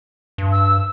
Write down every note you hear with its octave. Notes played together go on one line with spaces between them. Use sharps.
G2
E6